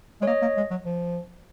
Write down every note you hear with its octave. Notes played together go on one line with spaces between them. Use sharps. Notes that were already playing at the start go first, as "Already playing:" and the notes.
G#3 C#5
A#3 D#5
A#3
G#3
F#3
F3